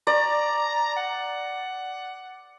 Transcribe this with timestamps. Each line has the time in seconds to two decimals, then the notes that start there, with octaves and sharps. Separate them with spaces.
0.07 D5 A#5
0.96 F#5